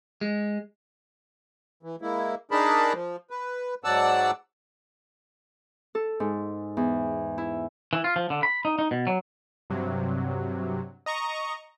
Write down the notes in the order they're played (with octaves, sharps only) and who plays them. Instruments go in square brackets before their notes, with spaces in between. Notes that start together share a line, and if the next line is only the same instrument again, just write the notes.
[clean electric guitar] G#3
[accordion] E3
G#3 A#3 E4
D4 D#4 G#4 A#4 A5 B5
F3
B4
G#2 F#3 D5 F#5 A5 E6
[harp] A4
G#2
E2
E4
[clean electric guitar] E3
F4
F3
D3
B5
D#4
D#4
B2
F#3
[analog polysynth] G2 C3 F#3
D#5 A#5 C#6